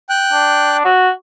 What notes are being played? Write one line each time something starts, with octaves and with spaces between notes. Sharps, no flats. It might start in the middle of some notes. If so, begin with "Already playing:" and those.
G5 F#6
D4
F#4